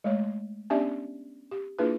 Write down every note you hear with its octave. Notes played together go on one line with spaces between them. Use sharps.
G#3 A3 C#5
B3 C#4 D4 G4 D5 E5
G4
A#3 D4 E4 F4 G#4 B4